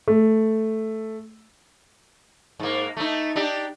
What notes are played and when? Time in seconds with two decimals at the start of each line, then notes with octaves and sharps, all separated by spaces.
0.08 A3
2.59 G#2 A#3
2.97 A3 D#4
3.36 D4 D#4 G4